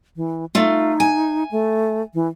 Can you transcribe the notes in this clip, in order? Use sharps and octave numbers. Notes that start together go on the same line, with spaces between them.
E3
A3 D#4 F4
G#5
A3
E3